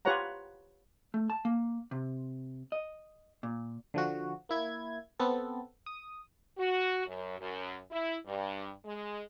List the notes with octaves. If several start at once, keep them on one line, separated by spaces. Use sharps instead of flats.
F4 G4 B4 C#5 F#5 A#5
A3
A5
A#3
C3
D#5
A#2
D3 F3 F#4
A#3 E4 G#6
B3 C4 A4
D#6
F#4
F#2
F#2
E4
G2
G#3